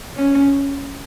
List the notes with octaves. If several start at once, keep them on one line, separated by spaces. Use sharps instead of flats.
C#4